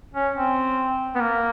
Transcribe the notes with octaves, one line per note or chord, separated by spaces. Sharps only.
C#4
C4
B3
A#3